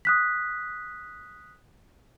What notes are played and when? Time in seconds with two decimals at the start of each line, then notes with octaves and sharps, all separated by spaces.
0.05 D#6 F#6 B6